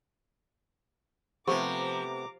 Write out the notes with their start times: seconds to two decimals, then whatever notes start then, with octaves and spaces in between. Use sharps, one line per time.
1.47 C3 F3 A3 B3 G4 A#5 D6